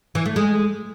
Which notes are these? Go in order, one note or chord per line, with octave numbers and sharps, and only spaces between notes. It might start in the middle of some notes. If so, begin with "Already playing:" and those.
E3
A3
G#3